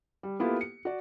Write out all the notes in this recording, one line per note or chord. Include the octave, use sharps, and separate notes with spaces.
G3
A#3 B3 E4 F4 G4 A4
C#7
F#4 D5